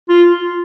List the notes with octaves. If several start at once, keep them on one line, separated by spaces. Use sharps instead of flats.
F4